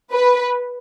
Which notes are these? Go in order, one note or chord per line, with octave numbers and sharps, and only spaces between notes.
B4